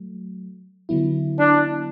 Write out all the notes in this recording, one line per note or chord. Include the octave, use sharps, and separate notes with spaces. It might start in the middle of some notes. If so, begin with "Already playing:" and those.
Already playing: F#3 A3
D3 F#3 B3 E4
D4